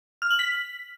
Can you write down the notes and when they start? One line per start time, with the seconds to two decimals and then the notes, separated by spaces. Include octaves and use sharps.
0.22 F6
0.30 F#7
0.39 B6